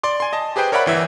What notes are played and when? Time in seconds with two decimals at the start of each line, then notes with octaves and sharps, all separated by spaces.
0.03 D5 C6 D6
0.20 G#5 C6
0.33 D#5 A5
0.56 G4 G#4 B4 C5 G5
0.72 A#4 C#5 D5 E5 F#5 B5
0.86 G1 E3 E5